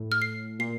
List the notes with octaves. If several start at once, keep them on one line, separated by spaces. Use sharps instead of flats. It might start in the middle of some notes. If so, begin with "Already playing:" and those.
Already playing: A2
F6
C7
A#2 C7